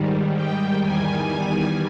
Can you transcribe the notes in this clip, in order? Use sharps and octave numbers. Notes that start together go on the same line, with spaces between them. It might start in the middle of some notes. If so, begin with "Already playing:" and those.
Already playing: G#2 D#3 G3
G5
E2 D#3 G3 G#5